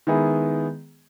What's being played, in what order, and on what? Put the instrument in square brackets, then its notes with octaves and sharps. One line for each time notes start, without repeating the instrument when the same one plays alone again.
[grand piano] D#3 G#3 B3 E4 G#4